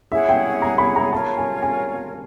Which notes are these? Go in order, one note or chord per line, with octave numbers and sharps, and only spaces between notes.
E4 G#4 C#5 E5 F#5
G5
A#5
B5
A#5
F4 A#4 C#5 A5
G#5
G#5